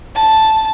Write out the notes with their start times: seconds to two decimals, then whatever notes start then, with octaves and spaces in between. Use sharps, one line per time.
0.15 A5